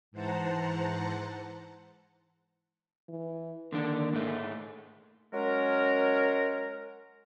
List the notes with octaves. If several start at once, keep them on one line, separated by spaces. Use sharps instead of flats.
G#2 E3 C5 F#5 A5 A#5
E3
D3 D#3 A#3 D4
G#2 G#3 A3
F#3 G#3 C#4 A#4